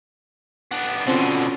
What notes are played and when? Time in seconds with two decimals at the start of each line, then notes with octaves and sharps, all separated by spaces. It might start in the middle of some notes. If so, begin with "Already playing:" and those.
0.72 B3 D4
1.07 B2 D3 C4 C#4 F4